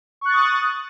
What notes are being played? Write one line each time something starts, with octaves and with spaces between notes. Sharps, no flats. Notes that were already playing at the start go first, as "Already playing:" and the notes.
C#6 D#6 F#6 A6